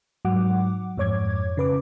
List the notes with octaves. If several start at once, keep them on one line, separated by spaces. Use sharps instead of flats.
G#2 F#3 F#5 D6
F2 G#2 C#5 D6 G#6
C#3 B4 D6